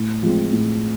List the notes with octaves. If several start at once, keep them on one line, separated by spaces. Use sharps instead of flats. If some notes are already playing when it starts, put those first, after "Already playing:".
Already playing: A2
F3 G#3 C4
A2